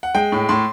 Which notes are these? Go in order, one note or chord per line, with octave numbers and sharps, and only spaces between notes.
F#5
G#3 G5
A2
A2 C6